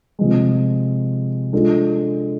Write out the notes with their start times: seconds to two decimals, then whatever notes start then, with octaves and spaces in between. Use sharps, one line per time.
0.19 C3 F3 G#3
1.53 G#3 D4 F4 A4